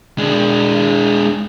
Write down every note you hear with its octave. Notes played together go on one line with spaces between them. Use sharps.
G#3 D4